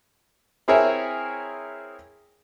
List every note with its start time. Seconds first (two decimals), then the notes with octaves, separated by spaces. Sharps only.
0.68 C4 E4 G#4 A#4 C#5 E5